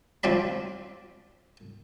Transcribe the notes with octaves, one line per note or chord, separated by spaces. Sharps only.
F3 C4 D5 B5